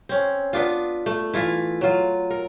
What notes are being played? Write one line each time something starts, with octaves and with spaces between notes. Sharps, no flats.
C4 C#4
B3 D4 F4
A3
E3 E4 F4
F#3 F4
A#4